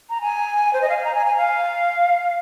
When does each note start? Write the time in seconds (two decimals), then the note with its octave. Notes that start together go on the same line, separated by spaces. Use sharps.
0.10 A#5
0.21 G#5
0.73 C5
0.82 D#5
0.89 F5
0.97 G#5
1.05 A#5
1.15 G#5
1.26 G#5
1.37 F5